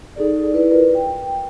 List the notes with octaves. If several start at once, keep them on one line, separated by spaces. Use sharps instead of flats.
D#4 G#4 A4 D5
E4 B4 D5
F4 A#4 B4
G5